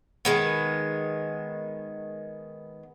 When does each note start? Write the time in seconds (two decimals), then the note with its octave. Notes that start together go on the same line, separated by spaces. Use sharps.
0.25 D#3 G#3 B3